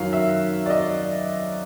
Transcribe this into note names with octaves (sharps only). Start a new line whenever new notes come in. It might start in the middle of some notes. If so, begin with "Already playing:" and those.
Already playing: F#2 D#3 F#3 F5
E5
D5
D#5